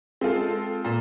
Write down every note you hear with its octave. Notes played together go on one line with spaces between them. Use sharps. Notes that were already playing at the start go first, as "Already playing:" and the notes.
G#3 C4 F4 A4
A#2